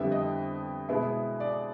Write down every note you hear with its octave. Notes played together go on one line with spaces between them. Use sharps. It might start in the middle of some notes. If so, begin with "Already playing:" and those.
Already playing: F2 D3 G3 B3 E4 E5
D#5
B2 G#3 B3 E4
D5